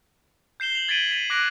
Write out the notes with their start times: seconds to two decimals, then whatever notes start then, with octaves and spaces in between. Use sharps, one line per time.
0.60 G6 C7 E7 G7
0.75 F7 F#7
0.89 G#6 A6 B6 D7 D#7 F#7
1.11 B6 D#7 F7 F#7
1.30 D6 F#6 A#6 D7 F7